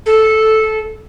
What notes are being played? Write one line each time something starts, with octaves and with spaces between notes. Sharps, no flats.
A4